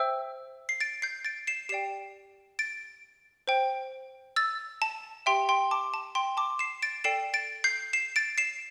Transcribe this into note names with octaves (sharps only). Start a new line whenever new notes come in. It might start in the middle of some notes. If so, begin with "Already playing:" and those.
Already playing: C5 E5 G5 E6
C7
A6 D7
G6 C7
A6 D7
C7 E7
G4 D5 G5 C7 E7
A6 D7
C5 G5
E6 A6
A5
G4 E5 G5 C6
G5 C6
A5 D6
A5
G5 C6
A5 D6
C7 E7
A6 D7
A4 D5 G5 C7 E7
A6 D7
G6 C7
C7 E7
A6 D7
C7 E7